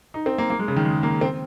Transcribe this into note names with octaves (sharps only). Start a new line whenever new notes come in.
D#4
C4
A#3
A#3
G#3
C#3
D#3
G#3
A#3
C4